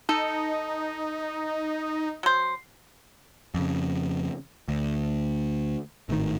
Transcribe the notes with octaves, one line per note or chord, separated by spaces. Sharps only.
D#4 A4
F#3 C5
F2 C#3
D2
G#1 A2 D#3